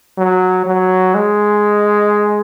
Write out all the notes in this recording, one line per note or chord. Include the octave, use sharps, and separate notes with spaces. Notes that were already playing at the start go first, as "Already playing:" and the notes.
F#3
F#3
G#3